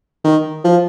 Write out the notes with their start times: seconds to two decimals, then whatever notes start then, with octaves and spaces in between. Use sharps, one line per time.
0.24 D#3
0.64 F3